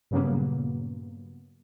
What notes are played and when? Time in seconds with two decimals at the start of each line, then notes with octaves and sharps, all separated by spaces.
0.11 G2 A#2 C#3 F#3 A#3 B3